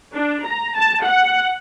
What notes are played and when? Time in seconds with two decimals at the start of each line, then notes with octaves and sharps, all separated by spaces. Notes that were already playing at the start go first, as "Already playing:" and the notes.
0.14 D4
0.44 A#5
0.75 A5
1.05 F#5